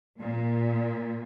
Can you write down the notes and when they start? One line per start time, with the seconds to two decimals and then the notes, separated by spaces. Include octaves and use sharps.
0.18 A#2